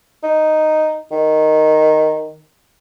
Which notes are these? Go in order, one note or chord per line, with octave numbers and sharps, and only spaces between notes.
D#4
D#3